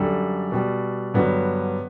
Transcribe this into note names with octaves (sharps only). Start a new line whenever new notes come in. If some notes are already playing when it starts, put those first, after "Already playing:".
Already playing: F#2 D3 G3 A4
B2 G3
G2 D3 F#3 B3